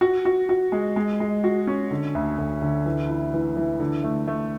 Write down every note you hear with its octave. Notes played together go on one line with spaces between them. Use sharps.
F#4
F#4
F#4
G#3
G#3
G#3
F#4
C#4
D3
D2
D2
D3
E3
E4
E3
E3
D3
A3
A3